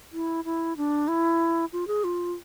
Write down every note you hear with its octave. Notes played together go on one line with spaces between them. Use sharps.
E4
E4
D4
E4
F4
G#4
F4